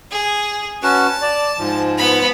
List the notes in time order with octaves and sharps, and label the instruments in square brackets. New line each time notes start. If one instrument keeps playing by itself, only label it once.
[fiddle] G#4
[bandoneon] C#4 F#4 B4 [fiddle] A5
[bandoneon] D5
G#2 F3
[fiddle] B3 B5